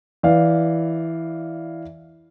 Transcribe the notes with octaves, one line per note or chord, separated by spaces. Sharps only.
E3 D5 F5